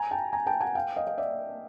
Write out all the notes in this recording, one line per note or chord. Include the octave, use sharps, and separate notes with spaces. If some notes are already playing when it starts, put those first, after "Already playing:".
Already playing: G#5 A#5
G5 A5
G#5 A#5
G5 A5
F#5 G#5
F5 G5
D#5 F5
D#5 F5
D5 E5